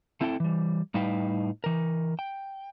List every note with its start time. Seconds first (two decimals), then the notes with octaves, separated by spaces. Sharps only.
0.21 A3 C4 E4 A4 D5 G5
0.40 E3 G3
0.94 A2 G3 D#4 B4 F5 G5
1.64 E3 A#4
2.19 G5